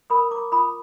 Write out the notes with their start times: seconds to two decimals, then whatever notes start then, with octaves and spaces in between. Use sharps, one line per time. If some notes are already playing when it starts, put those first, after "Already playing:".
0.10 A#4 B5 D#6
0.31 A#4 A#5 D6
0.52 F4 B5 D#6